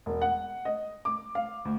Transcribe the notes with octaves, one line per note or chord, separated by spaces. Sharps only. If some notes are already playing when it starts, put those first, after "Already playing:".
E1
F#5
D#5
D6
F5
D2